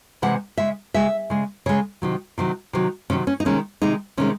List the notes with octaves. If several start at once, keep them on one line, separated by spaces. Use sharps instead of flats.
C3 E3 G#3 F#5
C#3 G#3 E5
C#3 G#3 E5
C#3 G#3
C#3 G#3 C#5
C3 D#3 F#3
C3 D#3 F#3
C3 D#3 F#3
C3 D#3 F#3 C#4
C#4
D#4
C3 D#3 G#3 C#4
C3 D#3 G#3 D#4
C3 D#3 G#3 C#4